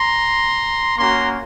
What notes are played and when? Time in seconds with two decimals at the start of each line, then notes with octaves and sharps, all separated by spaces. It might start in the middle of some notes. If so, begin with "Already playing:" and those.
Already playing: A#5 C6
0.98 A#3 C#4 F#4 A#5 C6